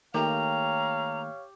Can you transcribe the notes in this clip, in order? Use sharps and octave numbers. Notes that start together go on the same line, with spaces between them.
D#3 A3 A#3 G4 C#5 F5 A#5